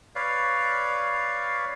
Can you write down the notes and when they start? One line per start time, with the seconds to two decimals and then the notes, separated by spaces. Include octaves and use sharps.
0.15 B4 C#5 D5 F5